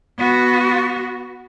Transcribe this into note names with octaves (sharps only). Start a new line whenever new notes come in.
B3 F#4